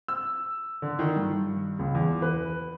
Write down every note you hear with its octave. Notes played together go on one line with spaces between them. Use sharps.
E6
D3
D#3
G2
C#2
E2
B4